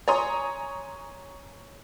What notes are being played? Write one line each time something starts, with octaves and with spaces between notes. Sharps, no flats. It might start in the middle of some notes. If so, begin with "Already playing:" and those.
C#5 G#5 A#5 C6 D#6